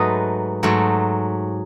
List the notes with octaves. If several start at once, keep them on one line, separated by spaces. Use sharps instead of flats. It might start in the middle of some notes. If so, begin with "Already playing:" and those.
Already playing: G#2 F#3 A3 B4 D#5
G#2 F#3 A3